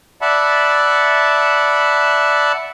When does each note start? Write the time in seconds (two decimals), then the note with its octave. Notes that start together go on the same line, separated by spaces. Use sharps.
0.22 D5 E5 F#5 A5 B5